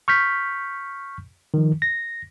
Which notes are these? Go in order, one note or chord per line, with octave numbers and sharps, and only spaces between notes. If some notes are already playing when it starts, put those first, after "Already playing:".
C#6 F6 G6 B6
D#3 F3
A#6